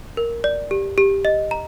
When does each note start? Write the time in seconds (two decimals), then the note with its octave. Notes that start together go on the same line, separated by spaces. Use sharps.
0.17 A#4
0.44 D5
0.71 G4
0.98 G4
1.25 D#5
1.51 A#5